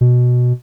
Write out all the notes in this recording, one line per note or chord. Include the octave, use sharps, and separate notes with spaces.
B2